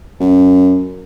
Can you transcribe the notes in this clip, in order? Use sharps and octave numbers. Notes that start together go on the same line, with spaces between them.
F#2